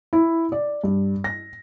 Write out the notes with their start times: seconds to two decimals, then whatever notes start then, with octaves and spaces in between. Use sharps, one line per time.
0.13 E4
0.52 D5
0.84 G2
1.24 A#6